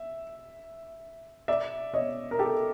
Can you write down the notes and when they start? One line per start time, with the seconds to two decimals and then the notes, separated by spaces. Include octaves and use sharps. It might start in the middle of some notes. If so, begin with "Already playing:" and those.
Already playing: E5
1.48 D5 E5
1.94 C#5 D#5
2.31 A#4
2.39 G4 A4